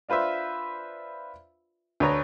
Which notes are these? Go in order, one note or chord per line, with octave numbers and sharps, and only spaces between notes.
D4 F4 B4 C5 E5
D2 B4 C#5 A#5